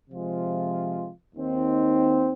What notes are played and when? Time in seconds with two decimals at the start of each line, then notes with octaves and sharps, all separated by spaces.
0.11 C3 F3 G#3 F4
1.36 D#2 D#3 C4 D#4